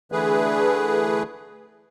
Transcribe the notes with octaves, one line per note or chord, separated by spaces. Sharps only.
D3 E3 A3 G#4 B4